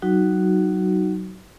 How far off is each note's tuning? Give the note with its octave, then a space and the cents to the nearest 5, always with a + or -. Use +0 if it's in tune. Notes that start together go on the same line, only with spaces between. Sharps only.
F#3 +25 D#4 +0 F#4 +0